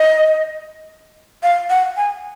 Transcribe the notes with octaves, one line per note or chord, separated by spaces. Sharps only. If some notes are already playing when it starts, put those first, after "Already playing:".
Already playing: D#5
F5
F#5
G#5